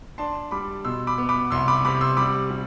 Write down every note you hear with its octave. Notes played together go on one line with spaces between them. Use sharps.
D4 A5 C6
G3 B5 D6
B2 C6 E6
B5 D6
B3
B5 D6
C2 C6 E6
B5 D6
C3 B5 D6
C6 E6
G3 B5 D6
G3